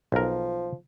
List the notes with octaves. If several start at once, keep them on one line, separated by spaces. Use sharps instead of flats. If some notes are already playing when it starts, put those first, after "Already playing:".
B1 F3 A#4